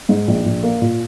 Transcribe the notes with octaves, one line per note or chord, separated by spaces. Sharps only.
G#2
A#1
A#1
A#3
A#2